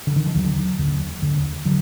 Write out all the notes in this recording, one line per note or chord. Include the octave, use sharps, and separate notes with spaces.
D3
D#3
F3
D#2 D3 F#3
D#2 D3
D#2 D3
D3 F#3